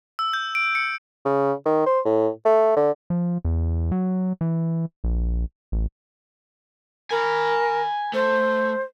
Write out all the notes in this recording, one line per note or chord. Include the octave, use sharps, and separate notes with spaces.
E6
G6
D7
C#7
C#3
D#3
C5
A2
A3
D3
F3
E2
F#3
E3
A#1
A1
A#4 G#5 B5
A3 C5